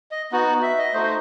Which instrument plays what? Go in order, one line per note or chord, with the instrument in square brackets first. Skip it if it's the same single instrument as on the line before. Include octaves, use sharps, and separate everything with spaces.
[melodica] D#5
B3 D#4 F#4
E5
D#5
A3 D#4 F#4 C5
C5